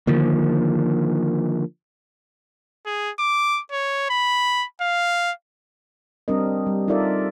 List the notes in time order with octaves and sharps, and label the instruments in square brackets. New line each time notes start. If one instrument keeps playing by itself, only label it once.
[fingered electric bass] D3 D#3 F3 A#3
[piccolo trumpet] G#4
D6
C#5
B5
F5
[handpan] G3 C4 D4 A#4 D#5
G3
D#4 F4 A4 A#4 D5 E5